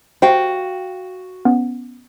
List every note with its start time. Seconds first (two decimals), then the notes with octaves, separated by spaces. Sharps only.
0.22 F#4 C5 F5 G5
1.45 B3 C#4